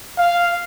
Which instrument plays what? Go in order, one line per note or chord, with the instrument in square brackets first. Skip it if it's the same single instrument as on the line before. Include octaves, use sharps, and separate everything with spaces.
[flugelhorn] F5